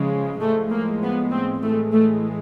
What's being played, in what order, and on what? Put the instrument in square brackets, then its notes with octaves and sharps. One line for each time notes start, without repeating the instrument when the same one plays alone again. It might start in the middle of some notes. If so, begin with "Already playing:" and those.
Already playing: [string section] C#3 F3 G#3
A2 F3 G#3 A3
A#3
B3
C4
A2 E3 G#3 A3
A3